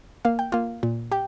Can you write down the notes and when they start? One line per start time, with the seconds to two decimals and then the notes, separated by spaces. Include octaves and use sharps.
0.25 A#3 F5
0.39 G5
0.52 A#3 F4 F5
0.83 A#2
1.12 G4 G5